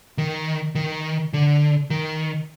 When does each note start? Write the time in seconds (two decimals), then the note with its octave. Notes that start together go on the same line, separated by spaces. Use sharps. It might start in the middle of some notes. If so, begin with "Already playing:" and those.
0.18 D#3
0.75 D#3
1.33 D3
1.90 D#3